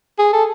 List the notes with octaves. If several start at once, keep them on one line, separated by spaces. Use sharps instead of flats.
G#4
A4